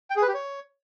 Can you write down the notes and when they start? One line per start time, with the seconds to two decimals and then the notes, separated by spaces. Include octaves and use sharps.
0.10 G5
0.16 G#4
0.22 B4
0.28 G4
0.34 C#5